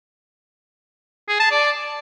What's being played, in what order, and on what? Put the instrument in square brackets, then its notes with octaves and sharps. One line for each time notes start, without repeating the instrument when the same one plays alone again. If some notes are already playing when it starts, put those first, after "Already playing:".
[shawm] G#4
A5
D5